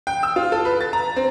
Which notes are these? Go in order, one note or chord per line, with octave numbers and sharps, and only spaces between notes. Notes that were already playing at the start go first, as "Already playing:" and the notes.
G5
E6
F4
A4
B4
A6
A#5
C4